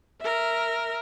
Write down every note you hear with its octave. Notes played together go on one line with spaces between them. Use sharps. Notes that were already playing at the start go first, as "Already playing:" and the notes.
A#4 E5